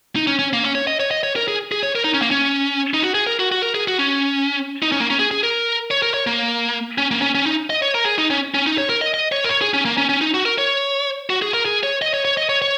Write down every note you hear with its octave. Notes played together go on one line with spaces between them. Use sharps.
D#4
C#4
C#4
A#3
C#4
C#5
D#5
C#5
D#5
C#5
A#4
G#4
G#4
C#5
A#4
D#4
C#4
A#3
C#4
D#4
F#4
G#4
A#4
F#4
F#4
A#4
G#4
F#4
C#4
D#4
C#4
A#3
C#4
G#4
G#4
A#4
C#5
A#4
C#5
A#3
C#4
A#3
C#4
C#4
D#4
D#5
C#5
A#4
G#4
D#4
C#4
C#4
D#4
C#5
A#4
D#5
D#5
C#5
A#4
C#5
G#4
C#4
A#3
C#4
C#4
D#4
F#4
A#4
C#5
F#4
G#4
A#4
G#4
C#5
D#5
C#5
C#5
D#5
C#5
C#5